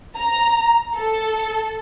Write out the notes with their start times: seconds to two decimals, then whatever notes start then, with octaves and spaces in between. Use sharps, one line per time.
0.16 A#5
0.97 A4